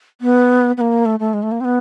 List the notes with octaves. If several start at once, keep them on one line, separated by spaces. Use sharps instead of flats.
B3
B3
A#3
A3
A3
G#3
A3
A#3
C4
B3